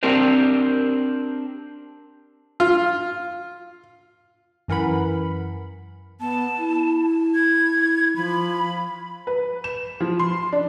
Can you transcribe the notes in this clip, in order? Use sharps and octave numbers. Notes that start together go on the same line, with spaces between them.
C4 D4 G4 A#4 C5
F4
F#2 E3 A#4 F#5 B5
B3 A5
E4
G#6
F3 B5
B4
E7
F3
C6
D4